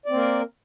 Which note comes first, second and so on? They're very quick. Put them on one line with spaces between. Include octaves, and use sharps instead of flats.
D5 C4 A#3 A#4